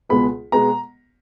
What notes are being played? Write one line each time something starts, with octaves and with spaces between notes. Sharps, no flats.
C#2 B2 G#3 B3 B5
B2 G#3 B3 A#5